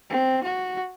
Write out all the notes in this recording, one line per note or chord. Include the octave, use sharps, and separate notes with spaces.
C4
F#4